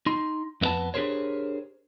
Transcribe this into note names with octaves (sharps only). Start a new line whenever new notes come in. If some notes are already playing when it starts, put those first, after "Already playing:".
D#4 C6
F2 A#3 B3 B4 A5
D4 G4 G#4 A#4 C5 C#5